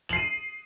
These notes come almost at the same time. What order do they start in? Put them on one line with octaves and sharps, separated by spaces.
F#7 C7 D#7